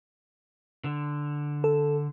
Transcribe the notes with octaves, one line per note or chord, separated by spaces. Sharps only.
D3
A4